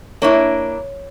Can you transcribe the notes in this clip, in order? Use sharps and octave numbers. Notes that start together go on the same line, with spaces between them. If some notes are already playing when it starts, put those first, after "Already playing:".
A#3 D4 E4 C#5 C#6